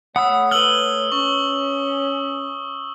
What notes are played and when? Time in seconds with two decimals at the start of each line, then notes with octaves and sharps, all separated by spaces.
0.16 A3 C#5 F#5 B5 D#6 E6
0.51 B4 E6 F6 F#7 G7
1.12 C#4 C#6